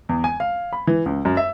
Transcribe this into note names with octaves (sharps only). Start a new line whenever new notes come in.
E2
G#5
F5
B5
E3
C#2
F#2
E5